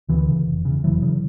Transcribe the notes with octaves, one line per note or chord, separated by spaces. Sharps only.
D2 D3 E3
C#3
F1
E2 C#3
F1 E3 F#3
C#3